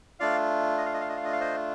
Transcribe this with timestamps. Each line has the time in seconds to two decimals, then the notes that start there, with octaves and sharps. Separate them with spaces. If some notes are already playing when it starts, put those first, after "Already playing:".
0.20 A3 D4 F4 D5 F5
0.78 D#5
0.85 F5
0.94 D#5
1.01 F5
1.09 D#5
1.17 F5
1.25 D#5
1.33 F5
1.40 C5 D#5